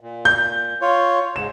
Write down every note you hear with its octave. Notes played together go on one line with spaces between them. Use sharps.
A#2
G6
F4 C#5
G#2 E7